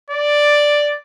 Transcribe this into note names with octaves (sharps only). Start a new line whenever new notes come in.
D5